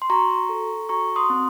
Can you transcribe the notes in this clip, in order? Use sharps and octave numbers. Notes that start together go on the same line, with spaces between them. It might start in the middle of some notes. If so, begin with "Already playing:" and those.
C6
F#4 A#5 C#6
A4
F#4 A#5 C#6
C6 D#6
C4